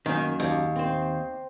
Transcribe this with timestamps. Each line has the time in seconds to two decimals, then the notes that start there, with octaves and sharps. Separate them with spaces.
0.06 F#2 D#3 A#3
0.40 D#2
0.76 C4 C5